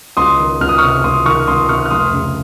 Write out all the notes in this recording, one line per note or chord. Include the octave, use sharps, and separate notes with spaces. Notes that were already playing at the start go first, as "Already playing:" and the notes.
C#2 C6 D#6
D#3
C#2 F6
D#6
C#6 F6
C3
C#2 C6 D#6
D#3 C#6 F6
C#2 C6 D#6
C3 C#6 F6
F6
F1 C6 D#6
C#3